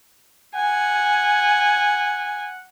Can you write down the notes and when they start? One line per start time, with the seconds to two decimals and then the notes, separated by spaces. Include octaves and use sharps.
0.56 F#5 G#5